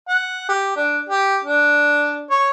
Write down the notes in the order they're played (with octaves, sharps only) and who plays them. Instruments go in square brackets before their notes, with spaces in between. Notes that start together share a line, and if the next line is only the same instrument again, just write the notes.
[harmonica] F#5
G4
D4
G4
D4
C#5